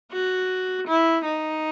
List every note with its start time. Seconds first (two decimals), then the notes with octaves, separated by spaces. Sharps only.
0.13 F#4
0.88 E4
1.25 D#4